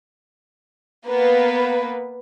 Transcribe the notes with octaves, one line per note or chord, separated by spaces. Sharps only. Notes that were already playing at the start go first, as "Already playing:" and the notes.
A#3 B3 B4